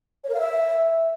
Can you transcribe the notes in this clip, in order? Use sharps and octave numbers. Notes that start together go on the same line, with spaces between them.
C#5
A#4
F5
E5